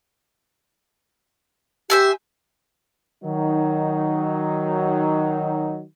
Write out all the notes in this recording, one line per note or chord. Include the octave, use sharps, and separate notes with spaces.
G4 C5 E5 G#5
D#3 F#3 D#4